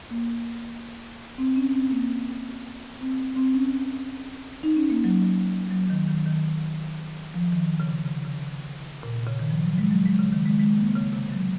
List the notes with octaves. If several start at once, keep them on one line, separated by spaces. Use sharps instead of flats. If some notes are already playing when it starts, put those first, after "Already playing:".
A#3
C4
C#4
C4
A#3
C4
C4
C#4
D#4
C#4
A#3
F#3
F#3
D#3
D#3
D#3
F3
D#3
C#3
C3
C#3
C#3
A#2
C3
C#3
D#3
F3
F#3
G#3
F#3
G#3
C#3
D#3
G#3
G#3
A#3
C#3
C3
F#3